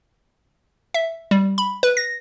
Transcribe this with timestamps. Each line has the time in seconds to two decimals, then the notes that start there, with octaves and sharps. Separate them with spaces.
0.94 E5
1.31 G3
1.58 B5
1.83 B4
1.97 A#6